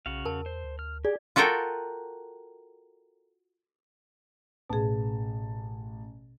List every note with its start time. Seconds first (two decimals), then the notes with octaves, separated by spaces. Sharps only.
0.06 B1 C#3 F#4 F5
0.25 E2 A#4 A5
0.46 C5
0.64 D2
0.79 F6
1.05 G4 G#4 D5
1.36 F4 F#4 A4 A#4 G5
4.70 A1 B2 G#4 A5